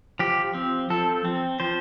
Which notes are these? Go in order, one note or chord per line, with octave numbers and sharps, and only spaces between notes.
F3 G4
C4
F3 A4
C4
F3 C5